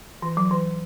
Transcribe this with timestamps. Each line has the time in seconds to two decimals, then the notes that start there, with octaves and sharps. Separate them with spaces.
0.22 E3
0.37 F#3
0.51 E3